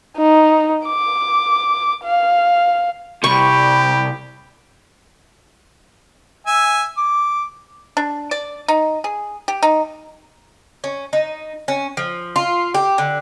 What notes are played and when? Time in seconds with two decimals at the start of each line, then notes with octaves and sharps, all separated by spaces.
0.17 D#4
0.86 D6
2.04 F5
3.24 C2 C3 G4 B5 C#6
6.47 E5 G#5
6.97 D6
7.97 D4
8.31 D5
8.68 D#4
9.04 G#4
9.48 G4
9.63 D#4
10.84 C#4
11.13 D#4
11.68 C#4
11.97 F3
12.36 F4
12.74 G4
12.98 D3